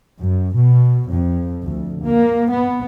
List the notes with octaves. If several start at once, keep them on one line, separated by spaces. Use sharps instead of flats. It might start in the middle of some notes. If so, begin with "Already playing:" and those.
F#2
B2
F2
D2
A#3
B3